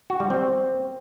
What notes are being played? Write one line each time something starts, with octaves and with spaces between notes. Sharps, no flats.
F#4
G3
C4